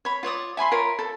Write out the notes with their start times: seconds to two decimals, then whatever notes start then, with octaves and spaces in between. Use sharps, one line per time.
0.05 C#5 B5
0.23 F4 C#5 D5 D#6
0.57 E5 G#5 B5 C6
0.71 F4 A#4 C#5 B5
0.99 A4